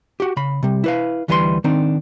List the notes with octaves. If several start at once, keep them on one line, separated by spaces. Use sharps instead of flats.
F#4 G4
C#3 B5
C3 G3
E4 B4 F5
D2 E3 G3 B4 C#5 C6
D#3 C4 D4 D#4